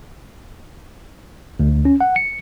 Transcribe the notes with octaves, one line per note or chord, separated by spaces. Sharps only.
D2
C#4
F#5
C#7